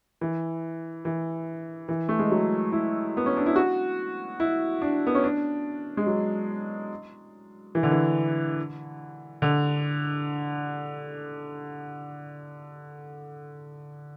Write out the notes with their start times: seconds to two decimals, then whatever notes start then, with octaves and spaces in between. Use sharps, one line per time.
0.21 E3
1.05 E3
1.89 E3
2.09 A3
2.19 G#3
2.31 F#3
2.72 E4
3.17 B3
3.26 C#4
3.37 D4
3.46 E4
3.56 F#4
4.40 E4
4.82 D4
5.07 B3
5.15 C#4
5.24 D4
5.97 G#3
6.07 F#3
7.75 E3
7.83 D3
7.91 E3
9.42 D3